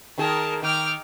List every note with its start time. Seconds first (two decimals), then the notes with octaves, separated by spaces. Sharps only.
0.18 D#3 D#4 G#4 A#4 A5
0.63 D#3 G5 D6 F6